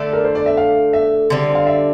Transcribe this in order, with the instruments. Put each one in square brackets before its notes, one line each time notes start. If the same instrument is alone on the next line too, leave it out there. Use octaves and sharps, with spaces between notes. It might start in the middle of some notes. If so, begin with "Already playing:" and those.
Already playing: [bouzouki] D3 A3 D4 A4 [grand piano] E5
[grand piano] A#4
C5
D5
E5
F5
E5
[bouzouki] D3 G3 C4
[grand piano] F5
E5